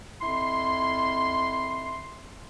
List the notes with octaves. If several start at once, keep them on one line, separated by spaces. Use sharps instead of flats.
F2 E4 C6